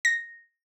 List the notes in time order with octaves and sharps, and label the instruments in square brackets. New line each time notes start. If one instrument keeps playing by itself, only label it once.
[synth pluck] A#6